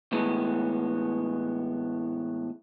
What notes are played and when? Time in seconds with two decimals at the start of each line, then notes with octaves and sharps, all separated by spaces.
0.13 A2 E3 G#3 B3